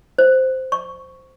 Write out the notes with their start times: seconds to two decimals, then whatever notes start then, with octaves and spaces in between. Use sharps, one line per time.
0.18 C5
0.72 C#6